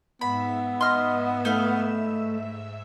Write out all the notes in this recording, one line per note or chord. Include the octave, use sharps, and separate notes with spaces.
G#2 B3 E5 B5 E6
D#5 C6 F6
A3 D#4 B4 F5